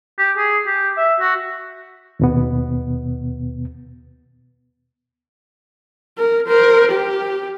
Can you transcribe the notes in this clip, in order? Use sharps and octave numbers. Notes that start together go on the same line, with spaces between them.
G4
G#4
G4
E5
F#4
D#2 B2 B3
A#4
A#4 C5
G4